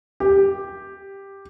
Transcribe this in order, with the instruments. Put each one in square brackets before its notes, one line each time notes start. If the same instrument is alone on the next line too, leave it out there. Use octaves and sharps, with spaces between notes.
[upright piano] G4